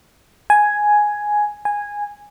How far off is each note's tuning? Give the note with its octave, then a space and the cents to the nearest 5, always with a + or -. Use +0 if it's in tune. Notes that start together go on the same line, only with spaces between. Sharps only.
G#5 +5
G#5 -10